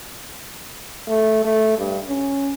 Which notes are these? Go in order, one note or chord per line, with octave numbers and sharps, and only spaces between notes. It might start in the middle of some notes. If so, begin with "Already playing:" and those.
A3
A3
G2
C#4